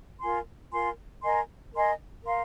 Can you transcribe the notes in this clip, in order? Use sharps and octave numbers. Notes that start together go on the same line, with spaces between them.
F4 A#4 G#5 C6
F4 A#4 G#5 C6
A#4 D#5 G#5 C6
A#4 D#5 G#5 C6
A#4 F5 C6